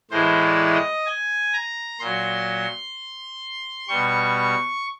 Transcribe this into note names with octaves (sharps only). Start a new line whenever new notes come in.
A2 E3 G#3 C5
D5
D#5
G#5
A#5
A#2 F#3 C6
B2 G3 C#6